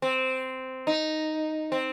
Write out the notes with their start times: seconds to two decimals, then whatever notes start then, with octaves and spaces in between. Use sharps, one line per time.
0.02 C4
0.87 D#4
1.72 C4